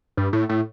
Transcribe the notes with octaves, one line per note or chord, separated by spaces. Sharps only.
G2
A2
A2